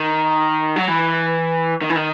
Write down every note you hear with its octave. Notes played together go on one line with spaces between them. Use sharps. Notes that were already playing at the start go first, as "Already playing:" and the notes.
Already playing: D#3
F#3
E3
D#3
E3
D#3